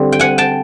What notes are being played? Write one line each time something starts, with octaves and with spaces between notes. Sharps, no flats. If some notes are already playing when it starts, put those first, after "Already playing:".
Already playing: D3 G3 C4
G5
F#5 G#5
G5 A5